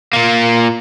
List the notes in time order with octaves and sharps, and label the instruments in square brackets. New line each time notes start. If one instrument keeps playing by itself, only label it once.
[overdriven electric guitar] A#2 A#3